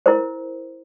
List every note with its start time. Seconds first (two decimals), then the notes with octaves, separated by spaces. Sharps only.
0.06 E4 A#4 C5